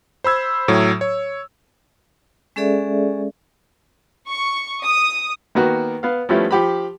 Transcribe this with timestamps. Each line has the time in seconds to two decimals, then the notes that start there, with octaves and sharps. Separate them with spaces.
0.24 C5 B5 E6 G#6
0.68 A2 F#3
1.01 C#5
2.56 G#3 C#4 G#4 A4 D5 E5
4.27 C#6
4.83 D#6
5.55 D#3 A#3 B3 F#4
6.03 B3 F5
6.29 F3 G3 A3 B3 C#4 E4
6.51 F3 G4 B5